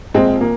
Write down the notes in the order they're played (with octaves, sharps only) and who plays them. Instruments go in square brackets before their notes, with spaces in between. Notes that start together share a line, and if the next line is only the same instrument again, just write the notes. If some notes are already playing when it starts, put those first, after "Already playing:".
[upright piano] A#1 G#3 C4
A#2 A#3